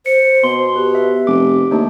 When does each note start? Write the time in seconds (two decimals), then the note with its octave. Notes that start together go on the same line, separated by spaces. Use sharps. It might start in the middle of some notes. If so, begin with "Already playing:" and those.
0.06 C5 C#7
0.44 B2 C6
0.76 G4 B4
0.95 E5
1.27 F1 D6
1.71 D#2 A3 D4